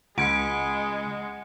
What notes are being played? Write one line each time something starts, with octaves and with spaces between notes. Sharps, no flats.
C#2 G#3 F#5 G#6 C#7 D7